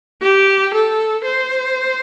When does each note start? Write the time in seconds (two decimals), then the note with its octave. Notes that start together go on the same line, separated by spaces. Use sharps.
0.22 G4
0.74 A4
1.26 C5